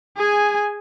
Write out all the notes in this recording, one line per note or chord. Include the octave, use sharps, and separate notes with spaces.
G#4 G#5